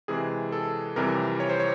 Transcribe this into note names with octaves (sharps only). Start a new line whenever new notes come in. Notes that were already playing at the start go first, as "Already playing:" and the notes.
C3 E3 G#3 G#4
A4
F2 C3 E3 G3 A#4
C#5
C5
C#5